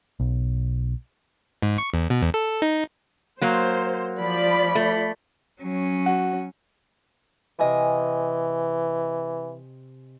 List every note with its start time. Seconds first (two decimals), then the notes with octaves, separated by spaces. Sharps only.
0.20 B1
1.62 G#2
1.78 C#6
1.94 E2
2.10 B2
2.22 E2
2.34 A4
2.62 D#4
3.41 F#3 A#3 C5
4.18 F3 D5 B5
4.75 A3
5.61 F#3 C#4
6.06 F#4
7.59 C3 E3 D#5 G#5